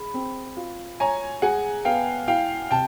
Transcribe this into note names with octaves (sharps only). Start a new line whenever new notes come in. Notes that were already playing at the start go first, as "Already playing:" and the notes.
Already playing: G#4 B5
C4
F4
C#5 G#5 A#5
G#4 F#5 G#5
B3 F5 G5
E4 F5 G5
C3 G5 A5